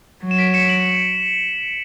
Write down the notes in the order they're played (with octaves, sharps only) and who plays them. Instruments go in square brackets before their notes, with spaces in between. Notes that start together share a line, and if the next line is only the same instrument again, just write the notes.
[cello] F#3
[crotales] E7
B6 D7
C#7 E7
D7 F#7